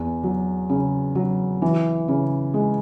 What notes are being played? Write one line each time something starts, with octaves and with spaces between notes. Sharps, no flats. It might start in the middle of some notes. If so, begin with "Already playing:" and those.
Already playing: E2
F#3
C#3
F#3
E3
C#3
G#3